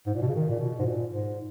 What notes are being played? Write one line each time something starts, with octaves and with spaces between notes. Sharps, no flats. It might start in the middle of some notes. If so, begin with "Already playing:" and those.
G#2
A#2
B2
C#3
D#3
A#2
B2
G#2
A#2
G#2